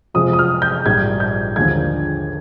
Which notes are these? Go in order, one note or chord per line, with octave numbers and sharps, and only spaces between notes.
F2 C3 F3 G#3 D#6
D#6
F6
G6
A#1 G#2 G3 G#6
G6
D#2 D3 F3 G#3 G#6